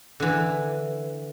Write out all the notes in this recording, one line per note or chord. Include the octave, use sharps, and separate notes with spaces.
D3 E3